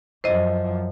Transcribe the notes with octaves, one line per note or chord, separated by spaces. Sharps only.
F#2 F3 C5 D#5